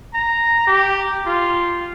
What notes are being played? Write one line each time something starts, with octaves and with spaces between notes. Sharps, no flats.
A#5
G4
F4